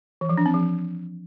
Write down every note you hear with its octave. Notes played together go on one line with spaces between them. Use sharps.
E3
F3
D4
C4
F3